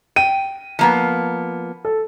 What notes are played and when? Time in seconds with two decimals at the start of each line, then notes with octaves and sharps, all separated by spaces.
0.16 G5 D#7
0.79 F3 A#3 B3
1.85 A4